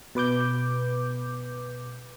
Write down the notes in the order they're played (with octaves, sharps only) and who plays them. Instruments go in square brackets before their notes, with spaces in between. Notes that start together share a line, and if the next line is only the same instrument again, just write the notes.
[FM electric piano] B2 B4 D6 G6